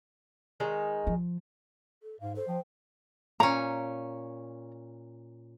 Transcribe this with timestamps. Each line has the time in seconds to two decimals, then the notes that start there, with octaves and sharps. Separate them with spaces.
0.60 D#3 G#3 D#4
1.07 F3
2.03 A4
2.20 G#2 F5
2.36 A4 C5
2.48 F3 G5
3.40 A#2 C#4 A#5